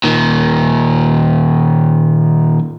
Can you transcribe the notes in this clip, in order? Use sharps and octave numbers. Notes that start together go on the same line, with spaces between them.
A#2 D#3